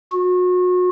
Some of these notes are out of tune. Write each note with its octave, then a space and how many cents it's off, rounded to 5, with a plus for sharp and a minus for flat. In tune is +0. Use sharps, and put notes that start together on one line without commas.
F#4 -35